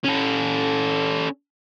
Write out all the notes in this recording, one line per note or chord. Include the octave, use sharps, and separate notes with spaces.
C#4 A4